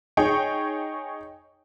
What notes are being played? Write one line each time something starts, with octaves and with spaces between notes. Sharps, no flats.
D#4 G#4 C#5 G5 C#6